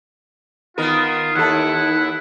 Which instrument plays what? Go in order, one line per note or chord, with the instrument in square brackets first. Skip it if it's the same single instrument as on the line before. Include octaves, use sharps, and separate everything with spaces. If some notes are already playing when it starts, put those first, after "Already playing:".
[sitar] D#3 B3 A#4 [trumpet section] F4
[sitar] D#2 A4 [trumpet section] E4 F#5